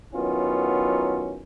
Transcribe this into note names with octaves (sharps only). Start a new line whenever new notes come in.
D#3 F#3 B3 C#4 E4 F4